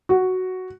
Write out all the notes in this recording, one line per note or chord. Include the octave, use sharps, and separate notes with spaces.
F#4